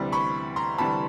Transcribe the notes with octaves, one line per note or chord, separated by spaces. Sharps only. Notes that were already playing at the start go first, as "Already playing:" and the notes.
Already playing: D2 C3 E3 G3
B5 C#6
A#5 C6
D2 C3 E3 G3 A5 B5